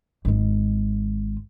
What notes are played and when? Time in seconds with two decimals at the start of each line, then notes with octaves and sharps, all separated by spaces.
0.25 G#1 G#3